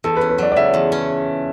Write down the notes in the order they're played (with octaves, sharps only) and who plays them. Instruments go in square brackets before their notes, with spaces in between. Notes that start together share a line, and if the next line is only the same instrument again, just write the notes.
[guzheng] E2 [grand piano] A4
[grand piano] B4
[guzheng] C#4
[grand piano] B4
[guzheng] F#3 [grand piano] D5
[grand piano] D5
[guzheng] C#3 [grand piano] E5
[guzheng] E2
C#4